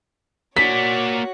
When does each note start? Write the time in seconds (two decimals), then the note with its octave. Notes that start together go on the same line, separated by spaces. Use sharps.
0.57 A#3 F#4 C#5 D5 B6